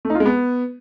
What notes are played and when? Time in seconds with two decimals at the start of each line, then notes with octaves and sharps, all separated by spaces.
0.05 A3
0.10 D#4
0.15 F4
0.20 G#3
0.25 B3